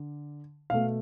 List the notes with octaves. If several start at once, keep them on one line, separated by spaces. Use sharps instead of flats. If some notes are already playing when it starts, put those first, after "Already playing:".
Already playing: D3
B2 A3 F5